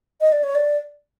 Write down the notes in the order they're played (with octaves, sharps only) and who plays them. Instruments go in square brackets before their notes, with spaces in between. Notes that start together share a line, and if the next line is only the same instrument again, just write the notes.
[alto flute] D#5
D5
C#5
D5